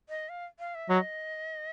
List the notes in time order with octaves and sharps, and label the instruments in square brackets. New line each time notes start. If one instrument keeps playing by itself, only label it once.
[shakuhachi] D#5
F5
F5
E5
[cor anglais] F#3 [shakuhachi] D#5